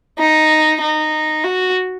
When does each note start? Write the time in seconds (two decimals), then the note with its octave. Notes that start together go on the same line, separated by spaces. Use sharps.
0.18 D#4
0.81 D#4
1.44 F#4